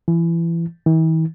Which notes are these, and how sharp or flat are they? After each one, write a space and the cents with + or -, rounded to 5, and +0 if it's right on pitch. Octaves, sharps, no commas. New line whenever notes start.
E3 +25
E3 -45